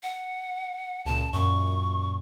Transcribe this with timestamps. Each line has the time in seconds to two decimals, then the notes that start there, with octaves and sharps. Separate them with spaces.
0.03 F#5
1.05 C#2 A#2 A5
1.33 F#2 A#2 C#6